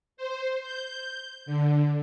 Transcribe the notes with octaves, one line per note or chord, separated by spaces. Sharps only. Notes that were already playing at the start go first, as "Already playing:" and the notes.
C5
G6
D3